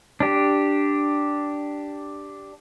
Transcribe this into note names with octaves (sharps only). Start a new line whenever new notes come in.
D4 G4